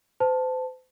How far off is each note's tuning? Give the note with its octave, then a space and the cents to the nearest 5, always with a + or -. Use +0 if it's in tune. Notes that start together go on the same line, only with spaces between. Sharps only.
C5 -40 A5 +0